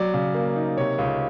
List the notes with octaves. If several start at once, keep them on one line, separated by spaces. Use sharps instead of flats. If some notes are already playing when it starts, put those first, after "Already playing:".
Already playing: F#3 D5
C#3
A#3
D#4
C3 C#5
C#2